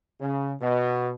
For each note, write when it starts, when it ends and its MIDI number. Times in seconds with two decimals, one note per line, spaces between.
0.21 0.54 49
0.61 1.12 47